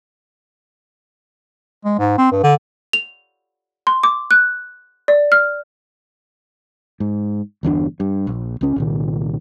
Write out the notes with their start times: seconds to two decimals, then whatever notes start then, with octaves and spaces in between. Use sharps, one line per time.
1.85 G#3
1.99 G#2
2.18 C4
2.32 G2
2.43 D3
2.93 F7
3.87 C6
4.03 D6
4.31 F#6
5.08 D5
5.32 F6
7.00 G#2
7.63 G1 E2 D3 D4
8.00 G2
8.27 A#1
8.61 C#2 C#4
8.76 C2 A#2 D#3